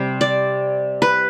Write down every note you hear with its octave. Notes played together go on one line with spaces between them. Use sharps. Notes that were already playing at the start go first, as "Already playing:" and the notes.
Already playing: C3 G3 C5
D5
B4